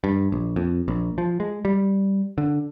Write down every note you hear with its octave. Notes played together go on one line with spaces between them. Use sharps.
G2
A#1
F2
A#1
F3
G#3
G3
D3